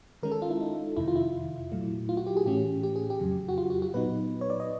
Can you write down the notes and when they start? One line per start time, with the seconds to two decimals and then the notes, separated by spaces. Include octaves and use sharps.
0.23 D#3 G#3 C#4 A#4
0.32 A4
0.42 F4
0.50 E4
0.60 D#4
0.97 F2 C3 D#3 E4
1.08 F4
1.16 E4
1.72 A#2 F#3 A3
2.09 F4
2.17 F#4
2.27 G4
2.37 G#4
2.45 A2 E3 A3 C#4 G4
2.83 G4
2.96 G#4
3.10 G4
3.20 F2 C#3 F#3
3.49 F#4
3.58 F4
3.70 F#4
3.82 F#4
3.94 A#2 F#3 B3 D#4 B4
4.41 C#5
4.50 D5
4.60 D#5